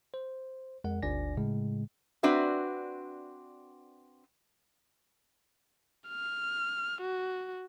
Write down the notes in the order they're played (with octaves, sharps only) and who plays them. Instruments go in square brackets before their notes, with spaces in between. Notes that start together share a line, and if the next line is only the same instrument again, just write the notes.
[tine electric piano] C5
F2 G#3 A#4 F#5
G1 D2 D4 D5 G#5 A#6
A2 C#3 G#3
[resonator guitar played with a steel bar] C4 D4 F#4 B4 E5
[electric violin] F6
F#4